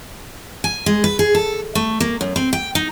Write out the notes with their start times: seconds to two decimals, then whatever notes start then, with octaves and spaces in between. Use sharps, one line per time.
0.64 G#5
0.86 G#3
1.04 B4
1.19 G#4
1.35 A4
1.75 A3
2.00 A#3
2.21 F#2
2.36 C4
2.53 G5
2.75 D#4